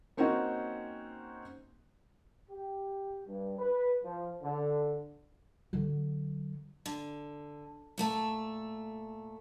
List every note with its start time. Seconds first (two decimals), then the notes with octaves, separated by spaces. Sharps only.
0.17 A#3 C4 C#4 D#4 F#4
2.50 G4
3.27 G2
3.59 B4
4.03 F3
4.42 D3
5.73 D3 F#3
6.86 D3
7.98 A#2 A3 A4